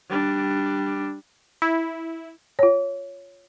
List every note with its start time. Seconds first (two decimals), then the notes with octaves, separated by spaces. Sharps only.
0.10 G3 D4
1.62 E4
2.59 F4 C#5